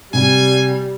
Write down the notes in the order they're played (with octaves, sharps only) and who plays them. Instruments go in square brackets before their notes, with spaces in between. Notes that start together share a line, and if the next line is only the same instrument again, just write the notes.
[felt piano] C3 [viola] G3 [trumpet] G#5